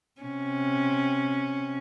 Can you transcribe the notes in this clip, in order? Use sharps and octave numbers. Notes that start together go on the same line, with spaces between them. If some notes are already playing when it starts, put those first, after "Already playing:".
C3 C#4